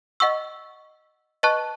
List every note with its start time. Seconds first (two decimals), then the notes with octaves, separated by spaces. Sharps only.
0.20 D#5 F#5 C#6 E6
1.43 B4 D#5 A5 C#6 F#6